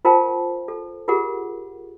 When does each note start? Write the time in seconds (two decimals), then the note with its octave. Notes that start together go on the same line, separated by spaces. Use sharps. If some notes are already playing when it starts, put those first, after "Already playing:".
0.05 F4 A#4 C5 F5 G5 A5
0.68 A4
1.08 F4 G4 G#4 A#4 F#5